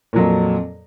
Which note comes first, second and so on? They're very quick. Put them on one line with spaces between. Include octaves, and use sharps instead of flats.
A#2 F#3 F2